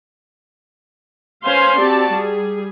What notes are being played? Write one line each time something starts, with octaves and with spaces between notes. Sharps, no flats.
C#4 B4 C5 F5 G#5 C6
C4 F#4 G4 D5 A5
G3 G#4